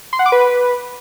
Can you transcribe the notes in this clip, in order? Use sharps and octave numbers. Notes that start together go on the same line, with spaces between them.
C6
F#5
D6
B4